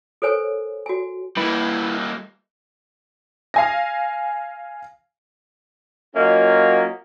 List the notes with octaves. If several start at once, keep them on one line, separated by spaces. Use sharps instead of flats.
A4 A#4 C5 C#5 G#5
F#4 G#5
G3 A#3 E4 B4
F5 G#5 A#6
F#3 A#3 C#4 F4 D#5